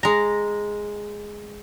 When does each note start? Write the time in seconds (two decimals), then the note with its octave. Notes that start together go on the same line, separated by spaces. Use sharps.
0.03 G#3 A#5